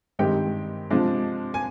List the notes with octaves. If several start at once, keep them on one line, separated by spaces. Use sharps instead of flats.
G2 D#3 G#3 C4 D#4 G4 G5
C3 F3 G#3 D4
G#5